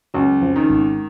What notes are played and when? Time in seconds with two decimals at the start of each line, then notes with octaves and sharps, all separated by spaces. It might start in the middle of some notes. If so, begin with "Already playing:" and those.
0.14 C#2 F#2 F#3
0.41 F2 F3
0.56 D#3
0.69 G#1 G#2